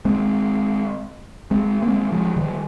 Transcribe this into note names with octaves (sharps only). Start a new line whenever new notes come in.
G#3 C4
G#3 C4
A#3
G#3 C4
F3 G#3
D#3 G3